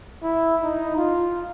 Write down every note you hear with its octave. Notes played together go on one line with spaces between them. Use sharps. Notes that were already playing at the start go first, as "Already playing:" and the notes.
E4
D#4
F4